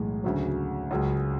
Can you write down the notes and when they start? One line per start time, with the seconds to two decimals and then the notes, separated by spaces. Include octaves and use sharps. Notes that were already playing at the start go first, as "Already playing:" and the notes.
Already playing: B1 A2 E3 G#3
0.24 D2 C#3 F#3
0.91 C#2 C#3 F#3